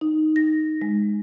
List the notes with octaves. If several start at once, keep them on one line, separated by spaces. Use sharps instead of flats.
D#4
A#6
G#3